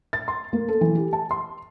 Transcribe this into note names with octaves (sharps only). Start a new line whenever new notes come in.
A6
C6
A#3
A4
E3
G4
A5
C6